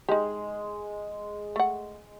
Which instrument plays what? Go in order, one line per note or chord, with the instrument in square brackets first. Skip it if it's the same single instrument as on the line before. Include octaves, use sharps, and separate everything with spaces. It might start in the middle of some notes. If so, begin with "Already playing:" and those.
[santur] G#3 [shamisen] D#4 G4
[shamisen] A3 F#5